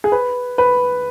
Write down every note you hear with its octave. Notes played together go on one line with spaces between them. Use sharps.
G#4
B4
B4